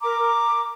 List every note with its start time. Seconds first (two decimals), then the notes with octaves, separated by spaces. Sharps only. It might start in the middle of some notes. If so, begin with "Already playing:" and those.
0.02 A#4 A#5 D6
0.19 A#4